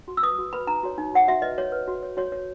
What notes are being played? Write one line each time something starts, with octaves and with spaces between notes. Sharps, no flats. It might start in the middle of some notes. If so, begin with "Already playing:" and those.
F#4
E6
B4 D#6
F#4
B4 B5
D#4 A#5
F#4 C#5
D#4
F#4 C#5 F#5
F#4 E5
B4 D#5
F#4 C#5
B4
F#4
C#5
F#4 C#5
C#5